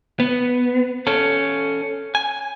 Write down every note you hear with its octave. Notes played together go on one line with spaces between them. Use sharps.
B3
C#4 A4
G#5